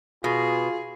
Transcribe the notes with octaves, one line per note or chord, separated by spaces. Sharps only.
B2 F4 G#4